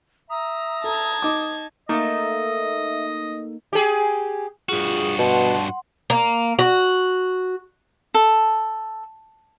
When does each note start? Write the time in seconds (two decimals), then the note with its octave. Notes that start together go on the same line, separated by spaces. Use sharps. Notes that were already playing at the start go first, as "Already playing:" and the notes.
0.30 E5 A#5 D#6
0.84 A4 A5 G#6
1.22 D#4 D6
1.89 A3 A#3 D#4 A4 D#5 E5
3.73 G4 G#4
4.69 G2 F4 F#4 G#4
5.19 B2 F#5 A5 C6
6.10 A#3
6.59 F#4
8.14 A4